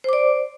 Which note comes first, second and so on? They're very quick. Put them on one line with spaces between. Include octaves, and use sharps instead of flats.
C5 D6 D5